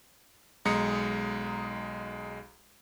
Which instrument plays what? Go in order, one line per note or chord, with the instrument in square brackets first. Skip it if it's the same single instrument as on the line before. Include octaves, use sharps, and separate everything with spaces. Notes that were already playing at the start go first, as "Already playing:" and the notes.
[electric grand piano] B1 G#3 A#5 D#6 C#7